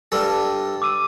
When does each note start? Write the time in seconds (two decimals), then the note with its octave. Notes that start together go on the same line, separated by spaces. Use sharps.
0.12 G2 D4 A4
0.82 D6 E6 D#7